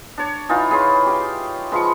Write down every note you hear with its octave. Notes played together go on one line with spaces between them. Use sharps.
D4 C#5
E3 D#4 F4
G#4 B4 C#5 C6
G4 F5 G5
F3 G#3 F4 B4 C#6